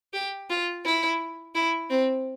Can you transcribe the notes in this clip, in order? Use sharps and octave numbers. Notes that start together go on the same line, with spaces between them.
G4
F4
E4
E4
C4